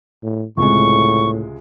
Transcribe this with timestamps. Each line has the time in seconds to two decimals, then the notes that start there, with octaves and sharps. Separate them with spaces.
0.22 A2
0.57 C#2 A2 C3 G#3 C#6